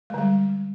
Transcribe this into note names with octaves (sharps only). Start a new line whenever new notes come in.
D3 G3 G#3